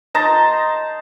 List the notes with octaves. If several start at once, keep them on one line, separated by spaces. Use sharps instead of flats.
D#4 A5 A#5 C6